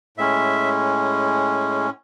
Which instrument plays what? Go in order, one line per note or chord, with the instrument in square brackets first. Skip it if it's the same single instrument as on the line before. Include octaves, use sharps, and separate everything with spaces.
[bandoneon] A2 G#3 C#4 E5